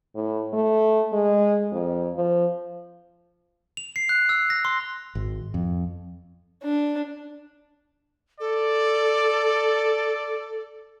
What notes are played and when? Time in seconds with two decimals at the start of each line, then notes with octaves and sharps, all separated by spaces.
0.15 A2
0.53 A3
1.13 G#3
1.72 F2
2.15 F3
3.77 F7
3.96 C7
4.09 F#6
4.29 E6
4.50 A#6
4.65 C6
5.15 G#1
5.54 F2
6.63 D4
8.40 A4 D5